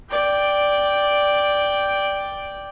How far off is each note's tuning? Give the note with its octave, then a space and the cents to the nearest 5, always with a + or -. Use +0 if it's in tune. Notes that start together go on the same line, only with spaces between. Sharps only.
D5 +0 G5 +0